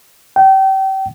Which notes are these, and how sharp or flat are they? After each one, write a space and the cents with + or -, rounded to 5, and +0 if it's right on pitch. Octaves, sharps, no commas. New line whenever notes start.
G5 -30